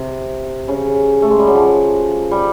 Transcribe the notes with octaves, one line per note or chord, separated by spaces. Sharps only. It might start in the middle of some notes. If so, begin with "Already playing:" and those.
Already playing: C3
C#3
A3
G#3
G3
F#3
F3
G3